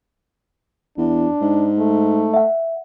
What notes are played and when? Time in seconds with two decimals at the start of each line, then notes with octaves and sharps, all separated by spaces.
0.98 E2 D4
1.41 G#2
1.79 A3
2.34 E5 F#5